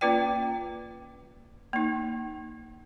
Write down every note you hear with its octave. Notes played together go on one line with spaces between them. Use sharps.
A#3 C#4 F4 B4 D5 G5
A#3 D#4